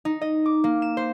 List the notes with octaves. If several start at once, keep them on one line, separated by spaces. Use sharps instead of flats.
D#4
D#5
D6
A#3
E7
C5